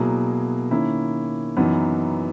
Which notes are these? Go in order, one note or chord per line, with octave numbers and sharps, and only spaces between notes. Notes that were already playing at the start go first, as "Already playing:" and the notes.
Already playing: B2 F#3 A#3 E4 G#4
D#3 A#3 C#4 E4
F#2 E3 B3 D#4